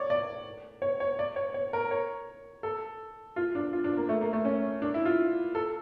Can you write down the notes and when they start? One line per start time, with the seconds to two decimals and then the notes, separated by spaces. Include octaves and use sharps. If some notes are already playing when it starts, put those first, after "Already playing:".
Already playing: C#5 D5
0.10 D5
0.82 C#5
1.00 C#5
1.19 D5
1.36 C#5
1.54 C#5
1.73 A#4
1.91 C#5
2.63 A4
3.36 F4
3.55 D4
3.73 F4
3.84 D4
3.97 A#3
4.09 A3
4.21 A#3
4.33 A3
4.45 C#4
4.82 D4
4.94 E4
5.05 F4
5.55 A4